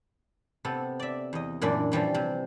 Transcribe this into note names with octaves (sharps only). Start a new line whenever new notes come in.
C3 B3 A4
D5 E5
E2 D#5
F#2 A#2 E3 D4 D5
E3 F3 G3 C#4
C3